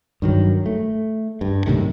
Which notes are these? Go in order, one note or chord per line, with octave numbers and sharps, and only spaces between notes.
G2 D#3 F#3
A3
G2
F#2 A2 C3 D#3